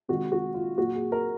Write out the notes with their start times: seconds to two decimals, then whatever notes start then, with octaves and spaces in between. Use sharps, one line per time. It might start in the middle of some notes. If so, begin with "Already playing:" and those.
0.08 C3 D#3 G#3 F#4
0.32 F#4
0.54 F4
0.78 A#2 F#3 F#4
0.95 G#4
1.12 A#4